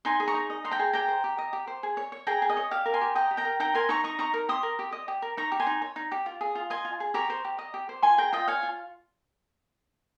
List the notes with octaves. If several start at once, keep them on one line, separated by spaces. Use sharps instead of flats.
D#4 G#5 C6
G#4
A#5 C#6
D#4
D#5
D#4 C6
G5 A#5
G#4
G4 G5 A#5
C5
G4
D#5
G4
C5
G#4
C#5
C#5
G#4 G5 A#5
G#4
D#5
C#5
G4 F5
A#4
G#5 C6
G4
D#5 G5 A#5
G4
G5 A#5
A#4
D#4 G5 A#5
A#4 G#5 C6
D#4 A#5 C#6
D#5 A#5 C#6
D#4 A#5 C#6
A#4
G4 C6 D#6
A#4
G4
D#5
G4
A#4
D#4 A#5 C#6
G4
G#5 C6
D#4
C#5
D#4
G4
F4
G#4
F4
D#5 G#5 C6
F4
G#4
G4 A#5 C#6
C5
G4
D#5
G4
C5
F4 G#5 C6
G#4 G5 A#5
F4 D#5 G5
C#5 F5 G#5
F4